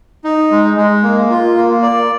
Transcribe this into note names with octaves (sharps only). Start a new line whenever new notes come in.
D#4
G#3
G#3
A#3
F4
A#3
D5